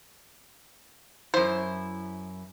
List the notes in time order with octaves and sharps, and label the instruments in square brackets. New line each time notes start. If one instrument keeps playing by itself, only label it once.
[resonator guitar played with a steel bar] F#2 E4 [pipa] C5